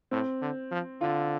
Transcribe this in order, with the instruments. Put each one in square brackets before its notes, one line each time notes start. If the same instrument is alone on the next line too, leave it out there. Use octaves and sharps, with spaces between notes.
[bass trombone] A2 [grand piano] C4
[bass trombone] D3
F3
[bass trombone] D3 [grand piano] F4